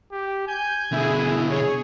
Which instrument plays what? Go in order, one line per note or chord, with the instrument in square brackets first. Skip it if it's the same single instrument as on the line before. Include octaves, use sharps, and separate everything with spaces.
[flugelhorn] G4
[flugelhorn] G#5 [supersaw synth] G6
[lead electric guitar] B2 D3 [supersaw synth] E4 G#4
[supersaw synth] G#4 C#5